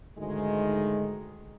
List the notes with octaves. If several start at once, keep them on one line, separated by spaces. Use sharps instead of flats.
D2 G#2 D#3 G#3